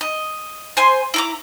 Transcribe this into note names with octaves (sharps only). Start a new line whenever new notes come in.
D#5
C5 G#5 C6
E4 A#5 D6